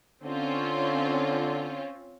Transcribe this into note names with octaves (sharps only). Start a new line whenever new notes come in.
D3 C4 C#4 F4